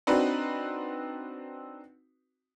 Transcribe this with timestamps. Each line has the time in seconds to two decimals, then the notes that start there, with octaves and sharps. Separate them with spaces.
0.07 C4 D4 D#4 F#4 B4